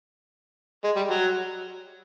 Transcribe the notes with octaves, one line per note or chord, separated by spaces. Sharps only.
G#3
G3
F#3